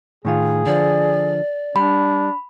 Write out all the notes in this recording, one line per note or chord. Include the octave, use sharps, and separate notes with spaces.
A2 D#3 F4 G#4
D3 F3 D5
G3 D4 B5